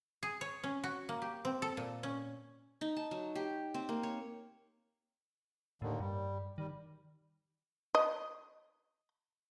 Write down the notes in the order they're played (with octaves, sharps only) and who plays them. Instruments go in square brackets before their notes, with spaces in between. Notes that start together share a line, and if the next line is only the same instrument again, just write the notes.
[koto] G#4
C#5
C#4
F#4
A#3
G4
C4
A4
A#2
C#4
[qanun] D#4
A5
F#3
G4
C4
A#3
C#5
[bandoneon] D#2 D3 D#3 [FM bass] A2
[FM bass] G2 [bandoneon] G3
[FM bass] D#3 [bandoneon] G3
[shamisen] D#5